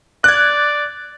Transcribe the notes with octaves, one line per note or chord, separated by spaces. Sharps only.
D5 F#6 G#6